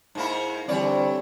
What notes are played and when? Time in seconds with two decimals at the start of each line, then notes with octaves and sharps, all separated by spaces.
0.15 G#2 A#3 E4
0.68 D3 E3 G3 C4 C#5 D5